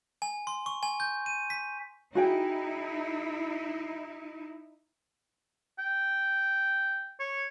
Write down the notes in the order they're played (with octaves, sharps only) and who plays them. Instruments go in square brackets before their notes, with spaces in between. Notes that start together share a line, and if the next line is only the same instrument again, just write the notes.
[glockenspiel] G#5
C6
C#6
G#5
G6
D#7
B6
[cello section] D#4 E4 [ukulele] F#4 G#4 G5
[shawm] G5
C#5